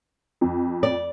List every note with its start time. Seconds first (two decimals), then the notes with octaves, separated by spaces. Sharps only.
0.41 F2
0.83 D5